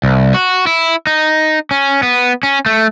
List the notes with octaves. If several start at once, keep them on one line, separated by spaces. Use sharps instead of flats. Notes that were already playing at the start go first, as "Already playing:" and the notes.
C2
F#4
E4
D#4
C#4
B3
C#4
A3